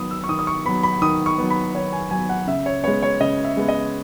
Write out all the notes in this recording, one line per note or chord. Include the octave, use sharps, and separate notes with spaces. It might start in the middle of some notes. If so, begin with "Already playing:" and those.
Already playing: D#3 F#3 B3 B5 D#6
E6
C#6
D#3 D#6
D#6
C#6
F#3 B3 B5
B5
D#3 D#6
C#6
F#3 B3
B5
D#3 C#5
G#5
F#3 B3 G#5
F#5
C#3 E5
C#5
G#3 B3 C#5
C#5
C#3 D#5
E5
G#3 B3
D#5